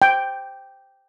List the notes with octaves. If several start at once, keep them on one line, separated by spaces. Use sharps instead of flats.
G5